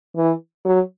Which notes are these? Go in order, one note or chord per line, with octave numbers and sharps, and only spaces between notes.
E3
F#3